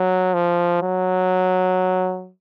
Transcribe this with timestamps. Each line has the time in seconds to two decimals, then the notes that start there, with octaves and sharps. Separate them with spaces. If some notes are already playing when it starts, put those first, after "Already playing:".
Already playing: F#3
0.34 F3
0.83 F#3